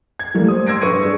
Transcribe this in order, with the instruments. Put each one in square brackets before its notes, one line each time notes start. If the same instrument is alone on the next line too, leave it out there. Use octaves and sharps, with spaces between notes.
[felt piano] G#6
E3 G3 A3 A#3
C5 D#6
C6 E6 G#6 A#6 D7
G2 B4 C#6 C#7 D#7
D4 G#4